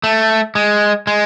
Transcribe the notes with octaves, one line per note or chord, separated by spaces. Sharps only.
A3
G#3
G#3